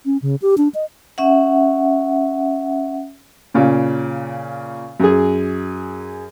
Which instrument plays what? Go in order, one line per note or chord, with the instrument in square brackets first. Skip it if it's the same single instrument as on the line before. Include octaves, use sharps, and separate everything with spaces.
[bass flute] C#4
C#3
G4
D4
D#5
[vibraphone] C#4 E5 F#5
[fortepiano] A#2 C#3
F#2 G#4